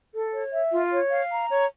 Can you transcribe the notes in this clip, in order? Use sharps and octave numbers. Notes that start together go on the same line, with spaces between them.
A4
C#5
E5
F4
C#5
F5
A#5
C#5